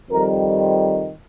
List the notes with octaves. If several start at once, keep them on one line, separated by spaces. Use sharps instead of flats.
F2 D#3 G3 A#4
C5